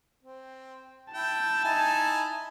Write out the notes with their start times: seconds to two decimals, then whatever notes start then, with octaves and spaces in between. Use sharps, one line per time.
0.23 C4
1.14 E4 G5 A5
1.65 D#4 E4 G#5